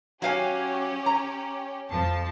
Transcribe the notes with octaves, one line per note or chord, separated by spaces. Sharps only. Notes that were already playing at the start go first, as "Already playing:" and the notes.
F#3 C#4 G4 F5 G#5
A#5
F2 F3 A5